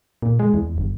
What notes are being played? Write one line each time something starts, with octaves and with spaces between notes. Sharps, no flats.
A#2
G#3
E2
G1